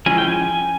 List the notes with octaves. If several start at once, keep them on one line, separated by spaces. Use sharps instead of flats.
F3 G#3 C#4 E4 G#5
G5
G#5